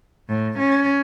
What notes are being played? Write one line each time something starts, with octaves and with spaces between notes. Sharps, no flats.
A2
C#4